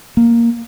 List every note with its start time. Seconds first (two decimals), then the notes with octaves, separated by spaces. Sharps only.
0.17 A#3